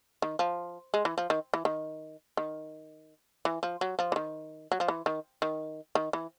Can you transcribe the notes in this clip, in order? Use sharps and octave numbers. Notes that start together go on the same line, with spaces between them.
D#3
F3
G#3
E3
F3
D#3
E3
D#3
D#3
E3
F3
F#3
F3
E3
D#3
F#3
F3
E3
D#3
D#3
D#3
E3